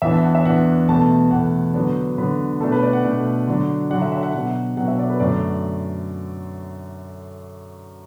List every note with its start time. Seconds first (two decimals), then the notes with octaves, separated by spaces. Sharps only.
0.02 E2 E3 D4 E5
0.13 A5
0.23 F#5
0.35 E5
0.45 E2 E3 D4 F#5
0.89 E2 B2 A3 A5
1.31 E2 B2 A3 F#5
1.74 D3 F#3 B3 D4 D5
2.18 D3 F#3 B3 D4 B4
2.61 B2 A3 D4 A4
2.72 B4
2.83 D5
2.93 F#5
3.04 B2 A3 D4
3.47 D3 F#3 D4
3.90 D3 F#3 D4 F#5
4.02 E5
4.12 E5
4.23 F#5
4.33 B2 F#3 D4 F#5
4.76 B2 F#3 D4 F#5
4.88 E5
4.99 D5
5.10 B4
5.20 F#2 D3 A3 D5